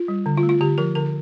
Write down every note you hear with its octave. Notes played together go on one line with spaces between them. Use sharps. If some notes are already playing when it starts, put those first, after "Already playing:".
Already playing: F4
G3
D3
F4
A3
F4
D3 G4
F3 A#4
D3 A#4